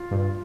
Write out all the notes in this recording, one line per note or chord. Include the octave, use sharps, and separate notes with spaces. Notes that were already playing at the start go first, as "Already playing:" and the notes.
Already playing: F4
G2